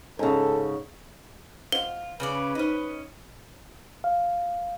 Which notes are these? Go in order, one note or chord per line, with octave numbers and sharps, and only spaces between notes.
G#2 C#3 A4
F4 C5 D#5 F#5 G7
C#3 C#4 B4 D5
C#4 D#4 C5 D#5
F5